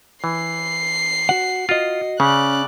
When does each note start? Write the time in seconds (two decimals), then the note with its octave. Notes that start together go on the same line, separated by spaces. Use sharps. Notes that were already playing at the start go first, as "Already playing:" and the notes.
0.24 E3 C7
1.29 F#4 F#5
1.69 F4 F#4 D#5
2.20 C#3 C#4 D5 F#6